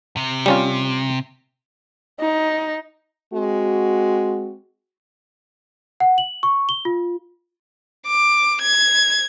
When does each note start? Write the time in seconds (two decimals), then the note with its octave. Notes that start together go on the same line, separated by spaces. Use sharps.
0.17 C3
0.46 G3 C#4 F4
2.21 D#4
3.34 G#3 C4 F#4
6.00 F#5
6.18 F#7
6.43 C#6
6.69 G7
6.85 F4
8.08 D6
8.61 G#6